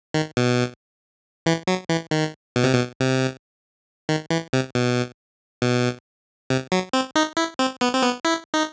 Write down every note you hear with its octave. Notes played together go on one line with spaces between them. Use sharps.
D#3
B2
E3
F#3
E3
D#3
B2
C3
B2
C3
D#3
E3
C3
B2
B2
C3
F#3
C4
D#4
E4
C4
B3
C4
B3
E4
D#4